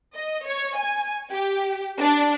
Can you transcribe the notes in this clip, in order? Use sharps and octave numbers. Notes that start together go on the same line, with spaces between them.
D#5
C#5
G#5
G4
D4